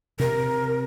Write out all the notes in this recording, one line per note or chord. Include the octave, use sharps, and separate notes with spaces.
C3 A#4